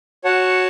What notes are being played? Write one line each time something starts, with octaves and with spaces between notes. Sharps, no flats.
F#4 C#5 F#5 A5